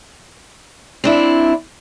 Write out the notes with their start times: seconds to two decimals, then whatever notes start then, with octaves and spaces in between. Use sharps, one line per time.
1.04 C4 D4 E4